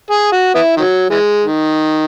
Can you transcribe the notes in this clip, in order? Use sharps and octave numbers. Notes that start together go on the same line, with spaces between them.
G#4
F#4
B3 E4
D#3 F#3
E3 G#3
D#3